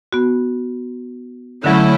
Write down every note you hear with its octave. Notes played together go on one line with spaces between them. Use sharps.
B3 F#4
D3 F#3 A3 C#4 E4